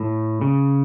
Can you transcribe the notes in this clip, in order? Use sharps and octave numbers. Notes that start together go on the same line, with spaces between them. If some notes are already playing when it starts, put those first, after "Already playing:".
Already playing: A2
C#3